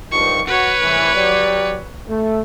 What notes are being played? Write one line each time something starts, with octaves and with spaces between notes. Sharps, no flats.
G2 D#3 F3 C#6
F#4 B4 C#5
C2 A2 E3
F#3 G4 D5
A3